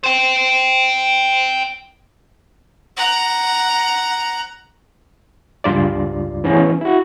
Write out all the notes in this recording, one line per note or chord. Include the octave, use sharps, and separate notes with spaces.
C5 G5
F#5 A#5
C#2 G2 F4 D5
E3 B3 C#4
E4 F#4